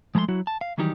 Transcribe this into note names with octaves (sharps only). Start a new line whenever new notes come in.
F3 G#3 A3 A#5 C6
F#3 E4 F#4
A5
F5
D#3 E3 F#3 G3 D#4 G4